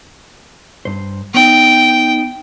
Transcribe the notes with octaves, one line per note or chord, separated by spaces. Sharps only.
G2 C5
B3 D#4 G5